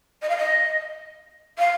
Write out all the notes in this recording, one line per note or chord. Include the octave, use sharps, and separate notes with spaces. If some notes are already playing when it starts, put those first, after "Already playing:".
D#5
F5
D#5
F5